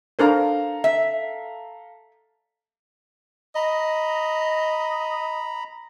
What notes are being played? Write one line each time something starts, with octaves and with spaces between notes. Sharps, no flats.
D4 A4 A#4 C5 F5 A#5
E5
D#5 A#5 B5